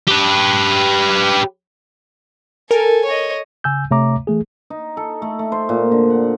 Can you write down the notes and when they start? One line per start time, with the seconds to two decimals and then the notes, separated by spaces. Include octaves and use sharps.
0.07 G4 B4
2.71 A4 A#4 G#5
3.05 C#5 D#5
3.64 C#3 G#5 E6 G6
3.91 C3 A3 C#5 E5 A#5 D6
4.27 E3 A3 G#4
4.70 D#4
4.97 A4
5.22 A3
5.39 A3
5.52 C5
5.69 A#2
5.92 D3
6.10 F#5